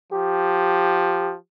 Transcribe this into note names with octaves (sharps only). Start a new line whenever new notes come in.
F3 G4